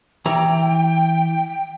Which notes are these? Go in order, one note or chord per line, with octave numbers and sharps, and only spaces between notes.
E3 G5 A#5